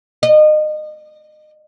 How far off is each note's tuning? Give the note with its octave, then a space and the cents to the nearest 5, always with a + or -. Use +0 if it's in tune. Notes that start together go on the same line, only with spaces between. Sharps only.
D#5 -30